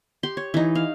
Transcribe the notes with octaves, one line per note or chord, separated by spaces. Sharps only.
G4 C6
C#5
E3 D#4
F5